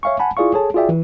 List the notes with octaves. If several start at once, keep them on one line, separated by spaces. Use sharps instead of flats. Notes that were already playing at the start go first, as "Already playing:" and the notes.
C#5 E5 F5 G#5 C#6
F#5 G#5 A5 B5
E4 F4 G#4 D5 F5 C#6
G#4 A4 C#5 A5
F4 F#4 G#4 D5 E5 G5
E3